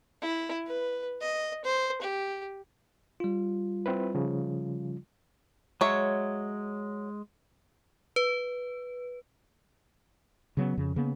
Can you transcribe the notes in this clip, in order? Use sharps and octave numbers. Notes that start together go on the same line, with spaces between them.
E4
B4
D#5
C5
G4
G3 F4
C4 E4 B4
C#3 F3
F#3 G#3 C#5 E5
B4
C#3 F#3 B3
F2 C#3
C#3 A#3 B3